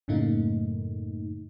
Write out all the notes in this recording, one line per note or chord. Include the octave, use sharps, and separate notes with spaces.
F#2 A2 C#3 A3 A#3 D#4